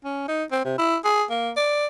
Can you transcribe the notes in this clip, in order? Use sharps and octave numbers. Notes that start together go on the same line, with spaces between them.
C#4
D#4
C4
C3
E4
G#4
A#3
D5